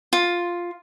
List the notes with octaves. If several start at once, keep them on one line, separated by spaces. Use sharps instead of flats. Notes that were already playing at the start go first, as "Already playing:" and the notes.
F4